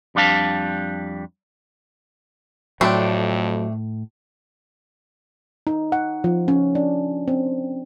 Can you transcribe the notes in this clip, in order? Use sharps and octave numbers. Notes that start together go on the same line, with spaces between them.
F2 G3 D4 F5 A5
F2 A2 F#3 A3 C4 D4 B5
D#4
F#5
F3
C#4
D4
C4